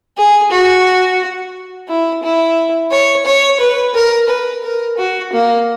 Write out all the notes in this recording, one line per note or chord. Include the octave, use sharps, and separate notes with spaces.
G#4
F#4
E4
E4
C#5
C#5
B4
A#4
B4
A#4
F#4
A#3